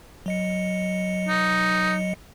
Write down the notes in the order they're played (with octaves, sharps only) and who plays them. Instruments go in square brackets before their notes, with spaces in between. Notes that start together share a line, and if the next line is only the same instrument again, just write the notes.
[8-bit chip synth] F#3 D#5 C#7
[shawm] D#4